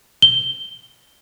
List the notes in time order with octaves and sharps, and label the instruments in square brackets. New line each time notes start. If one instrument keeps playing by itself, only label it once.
[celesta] G7